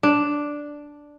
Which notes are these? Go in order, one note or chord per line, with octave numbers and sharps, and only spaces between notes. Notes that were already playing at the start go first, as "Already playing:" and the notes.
D4